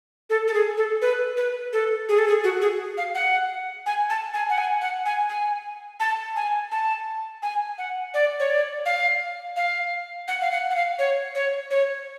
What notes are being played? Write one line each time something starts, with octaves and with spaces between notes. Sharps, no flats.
A4
A4
G#4
A4
B4
B4
A4
G#4
A4
G#4
F#4
G#4
F5
F#5
G#5
A5
G#5
F#5
G#5
F#5
G#5
G#5
A5
G#5
A5
G#5
F#5
D5
C#5
D5
F5
F5
F#5
F5
F#5
F#5
F5
C#5
C#5
C#5